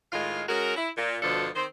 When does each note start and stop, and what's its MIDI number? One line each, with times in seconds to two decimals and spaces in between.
0.12 0.42 45
0.12 0.42 51
0.12 0.42 56
0.12 0.42 65
0.12 0.42 77
0.49 0.74 56
0.49 0.74 61
0.49 0.74 66
0.49 0.74 70
0.76 0.89 64
0.96 1.17 46
1.22 1.49 38
1.22 1.49 47
1.22 1.49 53
1.22 1.49 62
1.22 1.49 69
1.55 1.65 51
1.55 1.65 60
1.55 1.65 72